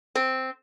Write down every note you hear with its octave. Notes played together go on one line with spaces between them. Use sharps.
C4